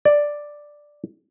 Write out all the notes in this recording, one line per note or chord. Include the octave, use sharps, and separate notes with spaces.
D5